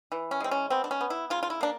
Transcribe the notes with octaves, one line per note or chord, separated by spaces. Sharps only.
E3
C#4
G#3 C4
C#4
B3 C4
D4
C#4
B3
E4
C#3 F4
F4
E4
A#3 D4